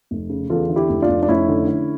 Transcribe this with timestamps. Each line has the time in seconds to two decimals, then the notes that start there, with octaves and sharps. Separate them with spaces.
0.11 F1
0.30 C#3
0.50 E2 F4 A4
0.69 D3
0.76 E4 G4
0.89 F1
1.02 D4 F4
1.09 F1
1.23 D4
1.28 F1 C#4 E4
1.49 D3
1.68 D3